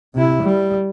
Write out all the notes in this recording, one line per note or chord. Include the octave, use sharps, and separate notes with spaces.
C3 E4
G3